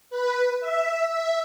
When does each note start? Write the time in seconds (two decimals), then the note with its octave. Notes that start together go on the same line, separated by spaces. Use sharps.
0.10 B4
0.60 E5
1.08 E5